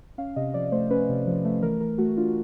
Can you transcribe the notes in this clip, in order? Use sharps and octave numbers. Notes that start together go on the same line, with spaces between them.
C#4 F5
C3 D#5
F3 D5
A3 C5
C#4 B4
C3
F3
A3
E3 A#4
E3 A#4
A3 F#4
D4 F4
F#4